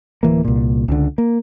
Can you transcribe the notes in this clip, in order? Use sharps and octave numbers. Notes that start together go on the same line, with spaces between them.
D1 E3 A#3
C2 A#2
C#2 D3
A#3